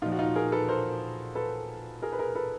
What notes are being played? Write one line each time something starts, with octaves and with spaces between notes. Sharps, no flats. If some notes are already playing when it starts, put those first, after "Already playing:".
A#2 F3 D#4 F4
F#4
D#4 F4
G#4 A#4
A4 B4
A#4 C5
A4 B4
G#4 A#4
B4
G#4 A#4
A4 B4